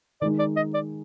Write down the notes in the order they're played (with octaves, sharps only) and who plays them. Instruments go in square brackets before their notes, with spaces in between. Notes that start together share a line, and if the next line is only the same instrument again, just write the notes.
[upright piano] D#3 G#3 D#4 [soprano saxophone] D5
[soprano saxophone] D5
D#5
D5